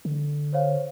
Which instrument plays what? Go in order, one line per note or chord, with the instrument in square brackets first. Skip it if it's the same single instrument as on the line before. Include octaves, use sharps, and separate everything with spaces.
[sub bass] D3
[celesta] C5 C#5 F5